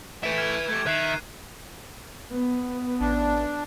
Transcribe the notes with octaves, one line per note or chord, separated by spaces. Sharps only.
A3 E4 B4 E5 G6 D7 E7
F6 G#6 E7
A3 G4 G#6
D#3 E5 F#6 C7 D#7
B3
A1 D4